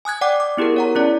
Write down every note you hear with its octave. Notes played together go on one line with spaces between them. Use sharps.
G#5 D#6 F#6 G#6
D5 F#5 G5 D6
D6
B3 E4 G4 G#4 A#4
C#5 F#5 A#5
C#4 E4 D5